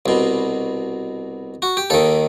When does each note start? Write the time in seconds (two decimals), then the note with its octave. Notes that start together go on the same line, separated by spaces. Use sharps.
0.06 C2 B2
1.62 F#4
1.77 G4
1.90 D#2 D#3 A4